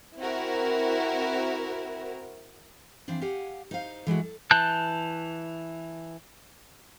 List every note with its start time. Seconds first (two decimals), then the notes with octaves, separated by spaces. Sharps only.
0.17 C4 E4 F#4 A#4
3.08 E3 F3 C4 D4
3.22 G4 F5 F#5 G#5
3.71 D#4 C5 F5
4.07 E3 G#3 A3 F#4
4.23 A4
4.51 E3 A5 F#6 G6